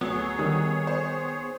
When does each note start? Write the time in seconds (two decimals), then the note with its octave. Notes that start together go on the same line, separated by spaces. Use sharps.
0.01 D2 F#3 B3 G#4 C#5
0.38 D#3 G3 D#6
0.87 C5